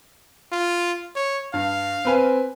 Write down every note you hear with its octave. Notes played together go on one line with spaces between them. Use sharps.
F4
C#5
G2 F5
C4 B4 G#5